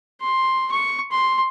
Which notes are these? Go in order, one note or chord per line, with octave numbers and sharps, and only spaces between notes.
C6
C#6
C6